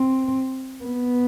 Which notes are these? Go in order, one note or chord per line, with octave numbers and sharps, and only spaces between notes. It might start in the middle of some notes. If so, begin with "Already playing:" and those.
Already playing: C4
B3